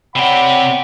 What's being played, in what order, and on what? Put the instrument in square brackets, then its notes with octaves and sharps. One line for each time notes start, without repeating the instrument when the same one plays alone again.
[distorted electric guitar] C3 G4 [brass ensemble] C#5 D5 F#5 [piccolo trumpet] B5